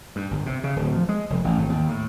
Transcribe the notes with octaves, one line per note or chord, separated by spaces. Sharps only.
G2
G1
C3
C#3
D1
F3
G#3
F1
A1
G#1
D#2
A2